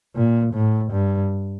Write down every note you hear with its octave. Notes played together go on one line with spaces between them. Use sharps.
A#2
A2
G2